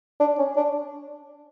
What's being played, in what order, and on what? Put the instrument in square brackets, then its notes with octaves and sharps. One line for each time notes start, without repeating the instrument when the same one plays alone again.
[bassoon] D4
C#4
D4